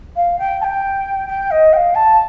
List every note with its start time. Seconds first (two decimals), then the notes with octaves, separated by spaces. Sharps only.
0.15 F5
0.38 G5
0.60 A5
0.63 G5
1.28 G5
1.50 D#5
1.72 G5
1.76 F5
1.94 A5